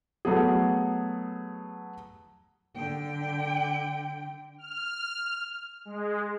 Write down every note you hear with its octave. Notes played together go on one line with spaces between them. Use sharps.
F#3 A3 B3 G#4
D3 G5
F6
G#3